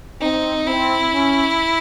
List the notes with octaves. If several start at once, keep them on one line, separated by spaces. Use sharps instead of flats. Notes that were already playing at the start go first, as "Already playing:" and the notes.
C4 D#4
C4 E4
C#4